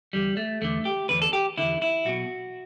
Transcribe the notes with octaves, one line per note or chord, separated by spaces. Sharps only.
E2 D3 G3
A3
E2 D3 A3
G4
E2 D3 B4
A4
G4
E2 D3 E4
E4
B1 B2 F#4